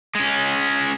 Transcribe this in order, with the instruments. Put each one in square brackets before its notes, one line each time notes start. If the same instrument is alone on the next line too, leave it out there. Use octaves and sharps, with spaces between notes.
[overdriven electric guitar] G#3 C#4